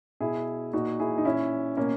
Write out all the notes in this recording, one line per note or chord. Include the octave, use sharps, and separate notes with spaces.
B2 E4 G#4
A#2 D#4 F#4
E4 G#4
D#4
A#2 C#4 E4
B2 A#3 C#4